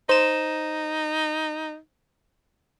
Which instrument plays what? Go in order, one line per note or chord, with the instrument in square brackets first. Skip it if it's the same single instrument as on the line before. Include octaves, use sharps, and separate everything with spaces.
[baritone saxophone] D#4 [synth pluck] C5 E7